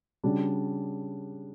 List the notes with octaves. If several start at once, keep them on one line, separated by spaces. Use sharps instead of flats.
C#3 G3 D4 F#4